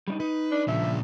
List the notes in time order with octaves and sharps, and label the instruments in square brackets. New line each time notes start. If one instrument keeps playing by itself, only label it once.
[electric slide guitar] G3 D4 D#4
[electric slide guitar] D#4 [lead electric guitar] B4
[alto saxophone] D4
[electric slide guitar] G2 C#3 F3 [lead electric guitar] A#2 D4 [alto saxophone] E5